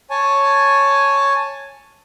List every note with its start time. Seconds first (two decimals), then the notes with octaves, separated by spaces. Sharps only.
0.10 C#5 G#5 A5